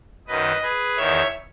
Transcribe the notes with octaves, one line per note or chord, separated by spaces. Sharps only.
F#2 D#3 B4 D#5
G#4 B4
E2 D#3 C#5 E5